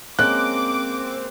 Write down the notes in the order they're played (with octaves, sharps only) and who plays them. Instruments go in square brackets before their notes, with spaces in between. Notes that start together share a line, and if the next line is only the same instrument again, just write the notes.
[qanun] G#3 A#3 C#4 [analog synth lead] C4 [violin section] D6 [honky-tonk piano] F#6